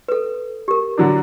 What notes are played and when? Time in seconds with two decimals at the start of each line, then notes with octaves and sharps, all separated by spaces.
0.08 A4 B4
0.68 G4 A#4
0.98 D3 F#3 D4